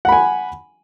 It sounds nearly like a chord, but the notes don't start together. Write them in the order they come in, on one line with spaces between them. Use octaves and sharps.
F#5 B5 G#5